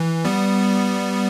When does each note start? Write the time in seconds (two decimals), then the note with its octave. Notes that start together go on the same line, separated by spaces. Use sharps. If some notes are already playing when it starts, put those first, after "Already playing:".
Already playing: E3
0.25 G3 B3